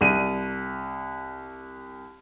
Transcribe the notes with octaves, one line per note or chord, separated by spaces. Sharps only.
C2 D#7